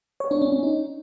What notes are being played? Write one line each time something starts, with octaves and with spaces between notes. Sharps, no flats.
C#5
D4
C#4
C#4
D#4